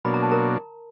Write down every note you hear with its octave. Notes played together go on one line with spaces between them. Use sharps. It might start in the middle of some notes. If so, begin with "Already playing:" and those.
B2 F#3 A#3 D4 B5
A#5
A5
A#4 A#5